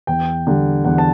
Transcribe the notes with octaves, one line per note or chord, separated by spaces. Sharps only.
E2 G5
D3 G3
E2 F#5
A5